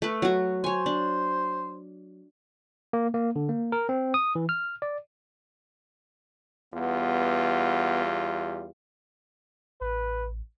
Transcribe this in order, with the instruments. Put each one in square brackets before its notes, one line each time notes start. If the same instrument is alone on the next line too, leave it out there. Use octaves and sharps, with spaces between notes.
[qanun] A3 B4
F#3 F#4
[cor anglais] C5 [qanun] C#5 G#5
[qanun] D4
[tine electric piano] A#3
A#3
D3
A#3
A#4
C4
D#6
E3
F6
D5
[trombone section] E2 G3 F4 [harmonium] B3
[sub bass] A1 [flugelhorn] B4